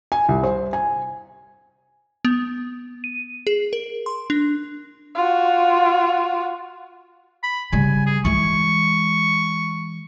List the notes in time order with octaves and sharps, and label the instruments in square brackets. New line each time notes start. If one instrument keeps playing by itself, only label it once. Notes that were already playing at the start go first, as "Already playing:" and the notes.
[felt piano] G#5
C2
C5
G#5
[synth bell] B3
D#7
G#4
A#4
C6
D4
[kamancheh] F4 F#4
[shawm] B5
[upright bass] C#3 G3 [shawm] G#5
[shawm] G#4
[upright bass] E3 G#3 [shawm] C#6